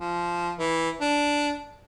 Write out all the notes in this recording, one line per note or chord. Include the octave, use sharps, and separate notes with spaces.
F3
E3
D4